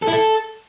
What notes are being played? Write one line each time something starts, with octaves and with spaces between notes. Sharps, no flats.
A4
E4
A4